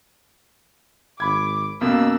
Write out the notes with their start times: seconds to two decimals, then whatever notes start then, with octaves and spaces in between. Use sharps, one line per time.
1.20 G#1 B5 D6 G#6
1.81 F2 B2 A#3 C#4 E6